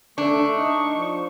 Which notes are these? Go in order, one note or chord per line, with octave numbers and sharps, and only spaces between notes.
A3 D4 C#6
D#4
F3